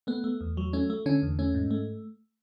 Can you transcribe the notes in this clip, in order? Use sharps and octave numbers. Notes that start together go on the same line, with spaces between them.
A3 B3
A3
E2
F#3
A3 C#4
A3
D3 C#4
E2
A3 C#4
G#2
A3